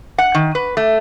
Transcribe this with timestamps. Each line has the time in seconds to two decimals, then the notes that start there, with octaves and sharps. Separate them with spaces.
0.18 F#5
0.35 D#3
0.55 B4
0.77 A3